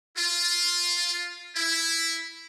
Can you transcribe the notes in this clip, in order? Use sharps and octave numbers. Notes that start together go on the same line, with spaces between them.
F4
E4